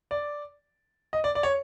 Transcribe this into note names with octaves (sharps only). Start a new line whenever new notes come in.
D5
D#5
D5
D5
C#5